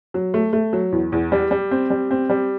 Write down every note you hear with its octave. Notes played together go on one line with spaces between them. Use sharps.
F#3
A3
A3
F#3
E2
E2
G3
G3
C4
G3
C4
G3